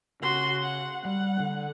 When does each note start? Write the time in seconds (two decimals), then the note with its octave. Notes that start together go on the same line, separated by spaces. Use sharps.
0.22 C#3 F#4 C6
0.62 F#5
1.05 G3 F#5
1.40 D3